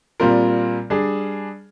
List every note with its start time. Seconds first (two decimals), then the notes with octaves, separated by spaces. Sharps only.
0.20 A#2 G3 C4 F4 A#4
0.90 G3 D4 G#4